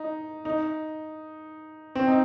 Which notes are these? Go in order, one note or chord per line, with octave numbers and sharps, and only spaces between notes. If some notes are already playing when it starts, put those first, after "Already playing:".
Already playing: D#4
D#4
C4
D#4